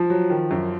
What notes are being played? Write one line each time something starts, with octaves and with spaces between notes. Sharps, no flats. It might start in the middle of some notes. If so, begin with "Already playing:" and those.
Already playing: F3
F#3
D#3
F#2